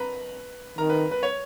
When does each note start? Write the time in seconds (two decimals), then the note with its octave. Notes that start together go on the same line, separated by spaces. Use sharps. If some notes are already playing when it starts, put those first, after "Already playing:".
Already playing: B4 A#5 B5
0.78 D#3 A#4 A#5
0.89 B4
1.11 B4
1.23 C#5